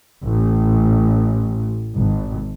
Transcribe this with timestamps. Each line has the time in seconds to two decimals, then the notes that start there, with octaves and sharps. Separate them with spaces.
0.22 A1
1.97 G#1